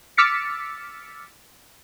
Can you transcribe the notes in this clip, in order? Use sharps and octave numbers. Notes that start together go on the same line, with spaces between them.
D6 E6 F6 A6 B6 C#7